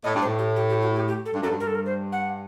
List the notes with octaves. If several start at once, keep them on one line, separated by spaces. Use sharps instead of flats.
A2 D#5
G2
C5
A2
G4
G4
G4
F#4
G4
G4
A4
G2
F#2 A4
G2
G2 A#4
A4
A#4
C5
F#5